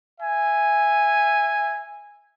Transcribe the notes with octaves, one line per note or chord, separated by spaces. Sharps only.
E5 G#5